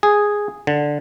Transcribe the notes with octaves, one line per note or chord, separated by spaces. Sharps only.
G#4
D3